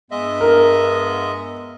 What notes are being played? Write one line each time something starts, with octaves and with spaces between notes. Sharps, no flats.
G2 G#3 B3 D#5 E5
A#4